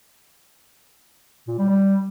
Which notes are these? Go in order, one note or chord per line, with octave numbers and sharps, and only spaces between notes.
A#2
G3
G3